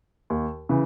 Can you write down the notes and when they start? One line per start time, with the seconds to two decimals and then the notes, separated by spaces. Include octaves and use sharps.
0.30 D#2
0.69 C#3 E3